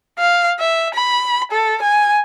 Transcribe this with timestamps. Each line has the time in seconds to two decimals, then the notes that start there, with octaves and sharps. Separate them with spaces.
0.19 F5
0.60 E5
0.94 B5
1.52 A4
1.82 G#5